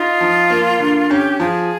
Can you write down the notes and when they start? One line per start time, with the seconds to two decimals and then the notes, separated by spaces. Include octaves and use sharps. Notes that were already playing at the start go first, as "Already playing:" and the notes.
Already playing: D#4 F4
0.21 F3
0.50 A#3
0.80 D3
1.10 C#4 G4
1.40 F3 G#4